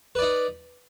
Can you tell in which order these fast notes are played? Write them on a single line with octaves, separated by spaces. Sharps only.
B4 D5 D#4